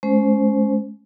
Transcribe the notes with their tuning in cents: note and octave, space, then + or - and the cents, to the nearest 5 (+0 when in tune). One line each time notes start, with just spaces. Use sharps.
G#3 +35 C#4 +0 C5 +0